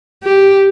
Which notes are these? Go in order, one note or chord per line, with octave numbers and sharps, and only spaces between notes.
G4